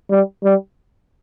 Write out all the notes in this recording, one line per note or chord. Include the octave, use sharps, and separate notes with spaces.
G3
G3